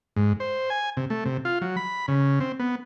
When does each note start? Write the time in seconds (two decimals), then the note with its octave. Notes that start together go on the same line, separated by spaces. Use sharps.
0.16 G#2
0.40 C5
0.70 G#5
0.97 C3
1.10 A3
1.26 C3
1.45 F4
1.61 F#3
1.77 B5
2.08 C#3
2.40 C4
2.59 B3